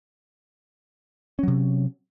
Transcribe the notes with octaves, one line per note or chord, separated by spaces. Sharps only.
C3 F#3 C#4